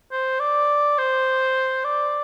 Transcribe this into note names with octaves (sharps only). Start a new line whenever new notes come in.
C5
D5
C5
D5